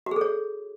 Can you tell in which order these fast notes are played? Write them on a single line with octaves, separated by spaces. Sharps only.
F#4 G#4 A4 C#5